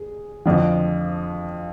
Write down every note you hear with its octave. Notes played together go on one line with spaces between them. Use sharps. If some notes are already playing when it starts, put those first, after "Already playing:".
Already playing: G#4
F2 D3 F3